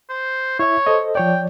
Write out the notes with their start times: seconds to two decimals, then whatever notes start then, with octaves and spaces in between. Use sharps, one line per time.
0.10 C5
0.59 E4 C#5 E5
0.86 A4 C5 D#5
1.15 F3 C#5 D5 G5